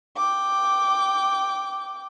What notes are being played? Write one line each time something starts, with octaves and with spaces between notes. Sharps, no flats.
G5 D6